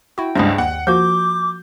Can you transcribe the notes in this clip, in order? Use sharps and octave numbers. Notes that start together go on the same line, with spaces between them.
E4 F#4 G5
C#2 G2 C5 D#5 F#5
D#2 F#5
F3 A#3 F#4 D6 G6